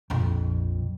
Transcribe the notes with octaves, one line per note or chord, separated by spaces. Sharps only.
A#1 F2